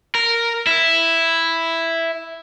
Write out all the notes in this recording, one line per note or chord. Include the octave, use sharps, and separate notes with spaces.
A#4
E4